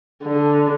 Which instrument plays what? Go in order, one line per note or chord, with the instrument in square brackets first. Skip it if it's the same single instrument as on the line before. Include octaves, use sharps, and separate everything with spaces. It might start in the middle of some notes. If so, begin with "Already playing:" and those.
[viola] D3